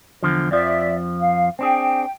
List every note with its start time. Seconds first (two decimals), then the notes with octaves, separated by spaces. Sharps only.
0.23 E2 D3 F3
0.51 F2 F3 D5 E5
1.19 F5
1.59 C4 D4 G#4 G5